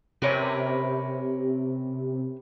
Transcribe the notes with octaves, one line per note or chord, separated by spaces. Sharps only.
C3 C#4 A#4 B4